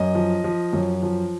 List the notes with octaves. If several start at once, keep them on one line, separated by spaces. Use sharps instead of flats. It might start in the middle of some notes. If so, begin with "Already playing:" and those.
Already playing: F#2 D#5
F3
F3
F#2
F3